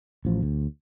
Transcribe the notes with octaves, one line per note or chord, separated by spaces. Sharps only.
A1 F3
D2